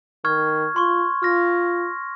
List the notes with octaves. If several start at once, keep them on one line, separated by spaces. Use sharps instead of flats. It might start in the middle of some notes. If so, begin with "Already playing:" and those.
D#3 C#6 F6 G#6
F4 C6 C#6
F4 F6 A#6